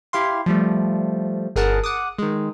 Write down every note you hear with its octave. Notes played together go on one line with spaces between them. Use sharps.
E4 G4 F5 C6
F3 G3 A3
G1 G#4 A#4 F#5 A5
F#5 D6 D#6
D#3 G#3